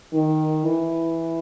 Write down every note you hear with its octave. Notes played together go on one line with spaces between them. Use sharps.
D#3
E3